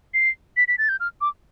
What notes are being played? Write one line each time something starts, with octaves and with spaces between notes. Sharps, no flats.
C7
B6
B6
A6
G6
F6
D6